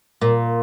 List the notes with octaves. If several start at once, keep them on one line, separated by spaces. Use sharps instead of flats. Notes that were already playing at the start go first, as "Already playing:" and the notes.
A#2